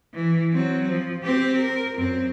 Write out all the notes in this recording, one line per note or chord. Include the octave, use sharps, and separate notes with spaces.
E3
F#3 C4
F3
C4 G4
A#4
F#2 C4